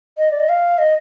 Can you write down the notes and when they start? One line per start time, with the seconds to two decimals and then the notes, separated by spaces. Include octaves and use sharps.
0.18 D#5
0.31 D5
0.40 D#5
0.49 F5
0.78 D#5